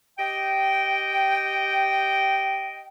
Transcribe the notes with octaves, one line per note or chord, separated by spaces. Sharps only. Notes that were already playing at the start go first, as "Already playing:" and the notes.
G4 D#5 G5